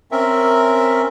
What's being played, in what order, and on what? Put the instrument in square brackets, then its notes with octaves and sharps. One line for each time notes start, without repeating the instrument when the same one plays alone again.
[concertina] C4 C#4 A#4 E5